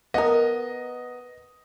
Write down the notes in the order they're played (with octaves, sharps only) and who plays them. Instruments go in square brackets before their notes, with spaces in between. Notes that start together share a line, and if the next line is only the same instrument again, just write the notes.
[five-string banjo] B3 A#4 [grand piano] D#5